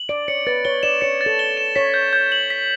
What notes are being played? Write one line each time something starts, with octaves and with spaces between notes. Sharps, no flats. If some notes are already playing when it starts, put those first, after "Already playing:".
Already playing: F#7
D5 D7
C#5 C#7
B4 A6
C#5 G7
D5 E7
C#5 C#7
A6
A4
G7
E7
C#5 B6
G6
G6
F#7
B6